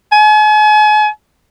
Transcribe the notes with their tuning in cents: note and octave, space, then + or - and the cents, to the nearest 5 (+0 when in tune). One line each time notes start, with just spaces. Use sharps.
G#5 +40